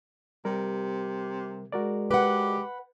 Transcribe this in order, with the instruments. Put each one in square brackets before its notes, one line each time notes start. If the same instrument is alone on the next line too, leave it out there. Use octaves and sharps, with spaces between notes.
[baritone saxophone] C3 [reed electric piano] G3 A#4
[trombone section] G#3 [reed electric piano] F#4 A#4 D5
[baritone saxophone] G4 [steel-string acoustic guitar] B4 F#5